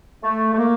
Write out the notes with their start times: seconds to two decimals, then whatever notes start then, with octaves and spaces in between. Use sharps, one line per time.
0.23 A3
0.53 A3
0.58 A#3